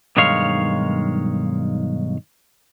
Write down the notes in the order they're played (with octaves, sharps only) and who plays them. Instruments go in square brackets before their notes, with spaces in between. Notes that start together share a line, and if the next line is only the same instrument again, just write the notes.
[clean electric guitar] B1 G2 D#3 G#3 C#5 F5